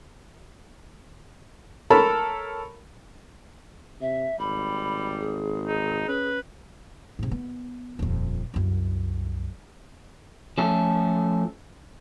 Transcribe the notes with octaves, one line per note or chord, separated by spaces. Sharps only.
A4 A#4 C#5 A5 B5
C3 E5
G#1 G3 B5
G#4
D#4
C#4 B4
G#2 C3
B3
D#1 F2
C2 F#2
F3 A3 C#4 A4